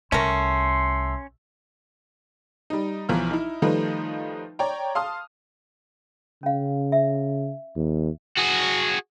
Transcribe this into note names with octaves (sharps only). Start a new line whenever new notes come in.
C2 A3 C#4 A#4 C6
G3 D#4
B1 E3 F3 A#5 F6
D#4 E4
D#3 F3 G3 A3 D#4 B4
C#5 D5 G5 A#5
F5 A5 C6 D#6 F6
C#3 C#4 F5
E5
D#2
F#4 G#4